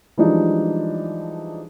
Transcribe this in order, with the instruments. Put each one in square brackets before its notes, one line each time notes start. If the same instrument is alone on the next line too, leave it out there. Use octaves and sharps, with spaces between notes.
[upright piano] E3 F3 G3 G#3 D4 D#4